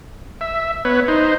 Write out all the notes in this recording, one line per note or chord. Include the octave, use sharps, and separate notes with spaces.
E5
B3 B4 C#5
D#4 C5